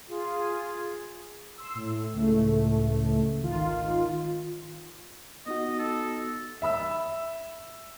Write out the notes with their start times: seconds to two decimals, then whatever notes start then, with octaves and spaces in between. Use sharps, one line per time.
0.08 F4 G#4
1.58 C6 E6
1.75 A2
2.13 C#2 A2 A3
3.41 G#1 D#3 F4
5.46 B3 D#4 F#4 D#5
5.79 A4
6.62 E5 B5 E6